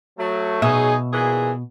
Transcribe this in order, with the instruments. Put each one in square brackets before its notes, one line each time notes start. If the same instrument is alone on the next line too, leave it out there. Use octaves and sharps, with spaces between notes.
[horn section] F#3 A3
[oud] B2 E5 [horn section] F#3 D#4 G#4
[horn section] A#2 E3 G#4